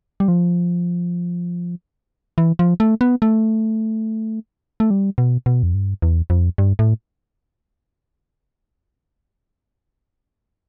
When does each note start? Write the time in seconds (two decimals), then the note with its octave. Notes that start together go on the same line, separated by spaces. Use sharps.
0.20 G3
0.28 F3
2.38 E3
2.59 F3
2.80 A3
3.01 B3
3.22 A3
4.80 A3
4.90 G3
5.18 B2
5.46 B2
5.63 F2
5.74 G2
6.02 E2
6.30 F2
6.58 G2
6.79 A2